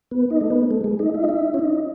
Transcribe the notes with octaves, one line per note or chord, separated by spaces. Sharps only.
B3
D#4
A3
B3
A3
G#3
D#4
E4
D#4
E4
C#4
D#4